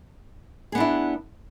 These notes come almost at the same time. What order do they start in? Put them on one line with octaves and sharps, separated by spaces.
G#4 B3 D4 E4